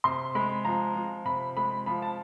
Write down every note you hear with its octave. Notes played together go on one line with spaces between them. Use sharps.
C3 C6
G#3 B5
F3 A#5
F3
C3 B5
G#3 B5
F3 B5
A5